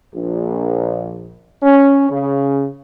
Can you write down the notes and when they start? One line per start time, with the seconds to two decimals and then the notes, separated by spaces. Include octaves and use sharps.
0.13 A#1
1.63 C#4
2.10 C#3